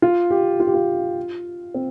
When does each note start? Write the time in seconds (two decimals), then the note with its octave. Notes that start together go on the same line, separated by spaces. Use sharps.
0.02 F4
0.30 G4
0.60 F4
0.67 G4
0.74 F4
1.74 C4